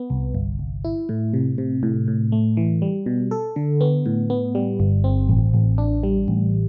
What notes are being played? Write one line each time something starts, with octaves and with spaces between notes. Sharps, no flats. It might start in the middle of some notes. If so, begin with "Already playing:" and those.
Already playing: B3
C2
G1
G1
E4
A2
C3
C3
A2
A2
A3
E3
G3
B2
A4
D3
B3
A2
B3
G3
G1
C4
A1
A1
D4
G3
A1